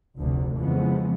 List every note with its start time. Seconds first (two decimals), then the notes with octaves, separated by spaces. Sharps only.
0.18 F1 D2 C3
0.59 F2 C#3 E3 F3 G#3 B3